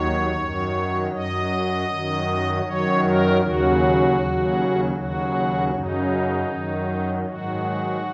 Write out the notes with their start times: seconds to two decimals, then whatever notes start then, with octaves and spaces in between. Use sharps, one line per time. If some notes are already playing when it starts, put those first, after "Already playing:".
Already playing: D#2 D#3 F#3 C#5
0.36 F#2 D#3 F#3
1.12 F#2 F#3 D#5
1.89 F#2 D#3 F#3
2.65 F#2 D#3 F#3 C#5
3.04 A#4
3.42 D#2 C#3 F#3 F#4
4.19 D#2 C#3 F#3
4.95 D#2 C#3 F#3 F#4
5.72 F#2 C#3 F#3 D#4
6.49 F#2 D#3 F#3
7.25 G#2 D#3 F#3 F#4